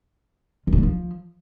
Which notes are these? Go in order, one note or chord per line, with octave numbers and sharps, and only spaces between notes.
D#3
G2
G#3
F3